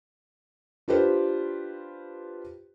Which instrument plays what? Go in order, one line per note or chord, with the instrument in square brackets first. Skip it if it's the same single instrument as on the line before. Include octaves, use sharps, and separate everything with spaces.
[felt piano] D4 F4 G4 B4 C5